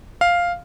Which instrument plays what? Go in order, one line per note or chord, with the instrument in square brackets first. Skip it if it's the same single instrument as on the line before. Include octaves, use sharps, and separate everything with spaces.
[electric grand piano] F5